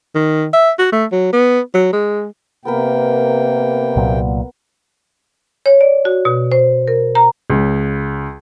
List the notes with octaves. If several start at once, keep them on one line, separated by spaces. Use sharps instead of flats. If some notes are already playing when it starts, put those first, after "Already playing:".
D#3
E5
F#4
A3
F#3
B3
F#3
G#3
C3 A#3 B3 A#4 B4 G5
C2 A#2 F#3
C#5
D5
F#4
B2
C5
A#4
A#5
C#2